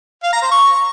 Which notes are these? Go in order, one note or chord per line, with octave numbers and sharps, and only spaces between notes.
F5
A#5
C5
C#6